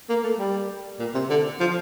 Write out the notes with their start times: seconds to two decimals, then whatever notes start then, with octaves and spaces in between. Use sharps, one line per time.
0.09 A#3
0.24 A3
0.39 G3
0.99 A#2
1.14 C3
1.30 D3
1.60 F3